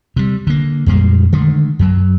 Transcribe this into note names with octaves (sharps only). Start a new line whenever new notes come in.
C3 G3
D3 A#3
F2 A#2 G3 G#3
D3 D#3 G#3 A3
F#2 F#3